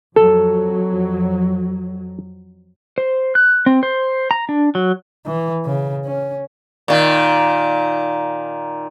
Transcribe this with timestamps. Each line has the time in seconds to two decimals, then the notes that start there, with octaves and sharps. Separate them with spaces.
0.16 F2 F#3 A4
2.98 C5
3.35 F#6
3.66 C4
3.83 C5
4.31 A#5
4.49 D4
4.75 F#3
5.26 E3
5.65 C#3
6.05 C#4
6.88 A#2 D#3